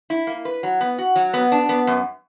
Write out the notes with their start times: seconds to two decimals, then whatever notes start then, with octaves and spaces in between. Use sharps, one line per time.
0.10 E4
0.27 A#3
0.45 B4
0.63 F#3
0.81 B3
0.98 F#4
1.16 F#3
1.34 B3
1.52 D4
1.69 B3
1.87 F#2